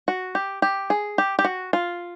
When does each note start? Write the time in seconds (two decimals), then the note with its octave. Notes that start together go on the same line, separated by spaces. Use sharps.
0.08 F#4
0.35 G4
0.62 G4
0.90 G#4
1.18 G4
1.39 G4
1.45 F#4
1.73 F4